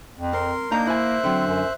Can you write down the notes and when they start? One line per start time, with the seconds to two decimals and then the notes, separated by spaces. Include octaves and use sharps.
0.18 F2
0.33 C4 A#4 C6
0.71 A#3 D4 D#4 C5 F5 A#5 G6
0.87 E4 C5 E5 G#5 F#6
1.24 D3 F#3 C4
1.47 F#2